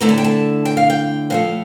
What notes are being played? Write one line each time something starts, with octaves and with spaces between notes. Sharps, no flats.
D3 A3 E4 A#5
A5
G5
A5
G5
F5
G5
A2 F3 A3 F5